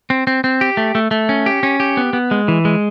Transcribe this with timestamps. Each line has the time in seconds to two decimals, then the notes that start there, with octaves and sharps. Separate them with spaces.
0.10 C4
0.27 C4
0.44 C4
0.61 G4
0.77 A3
0.95 A3
1.11 A3
1.29 C#4
1.46 G4
1.63 C#4
1.80 G4
1.97 B3
2.13 B3
2.31 G#3
2.48 E3
2.65 G#3